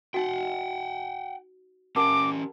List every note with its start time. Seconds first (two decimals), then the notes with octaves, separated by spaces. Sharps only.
0.14 D#4 F#4 F#5 G5
1.96 C#4 G4 A#4 F#5 A5 D6